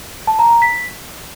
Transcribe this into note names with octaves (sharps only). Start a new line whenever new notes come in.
A5
A#5
A#5
B6